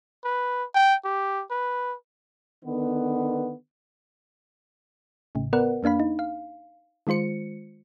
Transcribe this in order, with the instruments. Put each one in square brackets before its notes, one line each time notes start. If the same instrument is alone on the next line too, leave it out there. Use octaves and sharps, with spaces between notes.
[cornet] B4
G5
G4
B4
[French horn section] D3 D#3 B3
[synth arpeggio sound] A1 A2 C#3
B3 A#4 B4 D5 F#5
F2 A#3 D4 F5 B5
D#4
F5
D#3 G#3 F4 C5 C#7